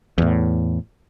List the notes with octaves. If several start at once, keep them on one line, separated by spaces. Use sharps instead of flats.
E2 A2